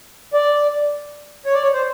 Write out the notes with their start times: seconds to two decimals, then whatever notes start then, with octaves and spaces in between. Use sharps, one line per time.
0.33 D5
1.46 C#5
1.54 D5
1.63 C#5
1.74 C5